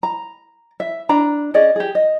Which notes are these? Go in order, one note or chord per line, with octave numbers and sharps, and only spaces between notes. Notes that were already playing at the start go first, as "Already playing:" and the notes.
A#5
E5
D4 A#5
C#4 G#4 D5 D#5
G4 G#4
D#5